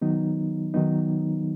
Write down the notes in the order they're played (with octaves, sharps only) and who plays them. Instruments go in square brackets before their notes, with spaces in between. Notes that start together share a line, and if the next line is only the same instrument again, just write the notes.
[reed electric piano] D#3 F#3 B3 D#4
D#3 F#3 B3 D#4